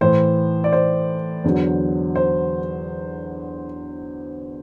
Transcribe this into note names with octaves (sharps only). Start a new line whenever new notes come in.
A2 E3 C5
D5
C5
E2 D3 F#3
C5